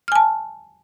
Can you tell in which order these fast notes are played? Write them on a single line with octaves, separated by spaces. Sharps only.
F6 G#5 A5